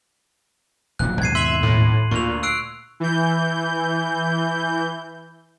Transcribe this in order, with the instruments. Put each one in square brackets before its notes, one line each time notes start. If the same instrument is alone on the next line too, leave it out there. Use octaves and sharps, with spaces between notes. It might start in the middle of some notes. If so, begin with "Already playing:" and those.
[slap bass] D#1 A#2 F#3 [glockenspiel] F#6
[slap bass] D#2 G#2 B2 [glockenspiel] G#6 C7 D#7
[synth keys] E5 [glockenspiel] C6 F#7
[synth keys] A2
[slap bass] D2 [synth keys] A#2 [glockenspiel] C#6 F7
[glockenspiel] E6 F#6 D7 [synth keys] C7
[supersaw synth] E3 G6